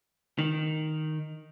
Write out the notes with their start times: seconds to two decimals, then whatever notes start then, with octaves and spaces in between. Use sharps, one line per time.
0.39 D#3